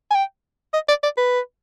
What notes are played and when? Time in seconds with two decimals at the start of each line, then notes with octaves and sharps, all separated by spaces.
0.11 G#5
0.15 G5
0.74 D#5
0.89 D5
1.03 D5
1.18 B4